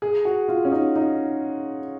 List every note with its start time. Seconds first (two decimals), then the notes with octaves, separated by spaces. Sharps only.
0.02 G#4
0.25 F#4
0.48 F4
0.65 C#4
0.72 D#4
0.96 D#4